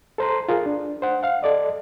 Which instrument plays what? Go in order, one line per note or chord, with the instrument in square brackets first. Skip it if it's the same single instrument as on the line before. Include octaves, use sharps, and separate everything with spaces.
[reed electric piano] A4 C5 A#5 C6
F4 G#4 A#4
D4
C5 F#5
F5 F#5
A4 D5 D#5